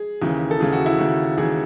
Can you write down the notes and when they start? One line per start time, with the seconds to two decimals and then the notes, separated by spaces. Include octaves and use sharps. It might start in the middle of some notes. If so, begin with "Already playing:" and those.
Already playing: G#4
0.22 D#2 C#3 E3
0.51 A4
0.60 D#2 C#3 E3 G#4
0.73 F#4
0.86 E4
0.98 D#2 C#3 E3
1.38 D#2 C#3 E3 G#4